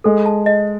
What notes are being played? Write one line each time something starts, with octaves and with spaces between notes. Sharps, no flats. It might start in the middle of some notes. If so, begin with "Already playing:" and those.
G#3 A4
A5
D#5